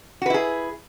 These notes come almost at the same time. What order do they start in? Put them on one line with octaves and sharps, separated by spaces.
F#4 B4 E4 G#4